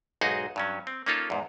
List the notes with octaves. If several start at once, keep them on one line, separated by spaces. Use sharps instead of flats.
B1 G#2 D#4 F#4 G#4 D#5
G2 F#3 C#4
C4
A#3 C#4 D#4 F4 A4
E2 G#2